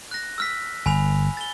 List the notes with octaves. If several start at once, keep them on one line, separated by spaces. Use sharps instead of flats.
F#6 A#6
E6 F6 B6
G1 G#5 B5 F7
A6 G7